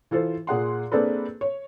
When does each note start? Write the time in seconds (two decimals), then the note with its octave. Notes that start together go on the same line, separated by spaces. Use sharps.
0.11 E3 F4 A4 C5
0.47 A#2 G#4 F#5 C6
0.92 A#3 C4 D4 G#4 A4 B4
1.41 C#5